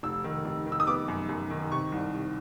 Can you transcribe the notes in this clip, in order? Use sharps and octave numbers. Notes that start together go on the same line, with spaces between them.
F1 E6
D#3
F1
D#3
E6
D#6
B3 D6
F#2
F#2
D#3
C3 C#6
C2
C3